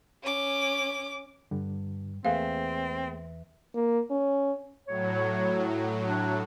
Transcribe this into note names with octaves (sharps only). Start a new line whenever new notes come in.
C#4 D6
G2 D3 G3
E2 A3 A#3 C4 G#4 B4 E5 F5
A#3
C#4
A2 F#3 C#5
D4